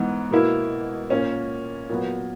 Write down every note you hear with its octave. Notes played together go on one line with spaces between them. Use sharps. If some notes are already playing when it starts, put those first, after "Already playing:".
Already playing: G#2 E3 B3
B2 A#3 E4
A#2 A#3 C#4
A#2 F#3 B3